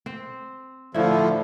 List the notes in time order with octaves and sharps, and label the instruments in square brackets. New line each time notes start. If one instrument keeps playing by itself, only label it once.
[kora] C4
[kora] A2 E4 [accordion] D3 F3